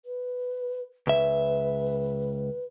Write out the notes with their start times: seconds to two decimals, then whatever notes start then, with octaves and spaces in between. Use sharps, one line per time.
0.05 B4
1.07 C#2 B4 E5